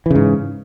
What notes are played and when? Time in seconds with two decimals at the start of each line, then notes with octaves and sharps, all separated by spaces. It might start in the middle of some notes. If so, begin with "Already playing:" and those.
0.06 E3
0.11 C#3
0.15 G#2